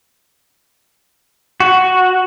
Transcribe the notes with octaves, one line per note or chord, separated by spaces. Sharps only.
F#4